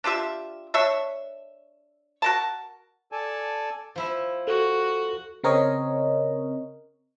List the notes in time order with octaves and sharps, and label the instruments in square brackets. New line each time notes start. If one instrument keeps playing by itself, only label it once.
[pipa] D4 F4 G4 E5
D4 C#5 E5
F#4 A#4 A5
[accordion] A4 D5 G#5 A5
[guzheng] F3 E4 E5
[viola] F#4 [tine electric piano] A4
[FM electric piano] C#3 C4 A#4 C#5 D#5